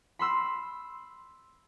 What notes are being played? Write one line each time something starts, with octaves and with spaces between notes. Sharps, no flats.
B5 C6 E6